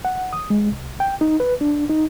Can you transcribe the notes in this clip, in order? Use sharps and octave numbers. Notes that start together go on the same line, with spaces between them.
F#5
D#6
G#3
C2
G5
D#4
B4
D4
D#4